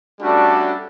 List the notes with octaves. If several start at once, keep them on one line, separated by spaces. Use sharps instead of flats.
G3 A3 C#4 D4 F#4 A4